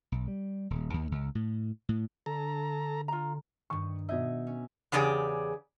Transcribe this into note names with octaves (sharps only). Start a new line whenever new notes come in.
B1
G3
D#1
D#2
C#2
A2
A2
D3 A4 A#5
F4 A#5
G2 D#3 C#6
B2 D#4 E5 G#6
C#4
E2 C#3 G4 G#4 D5